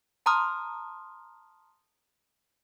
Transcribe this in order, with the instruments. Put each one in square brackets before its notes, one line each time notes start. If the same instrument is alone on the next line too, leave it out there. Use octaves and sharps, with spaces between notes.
[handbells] A5 A#5 C6 D#6 F6